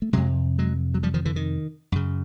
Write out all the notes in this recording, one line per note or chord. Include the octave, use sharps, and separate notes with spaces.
A3
F2 C3 F#3 G#3
F#3 G#3
F#3
F3 G3
D#3 F3
D3 E3
D#3
F#2 C#3